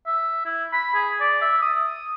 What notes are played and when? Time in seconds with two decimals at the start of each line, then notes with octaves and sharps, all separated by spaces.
0.07 E5
0.46 E4
0.73 B5
0.95 G#4
1.21 D5
1.42 E5
1.62 D#6